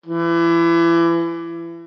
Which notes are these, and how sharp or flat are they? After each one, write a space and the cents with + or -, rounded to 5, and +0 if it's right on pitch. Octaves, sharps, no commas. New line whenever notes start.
E3 +30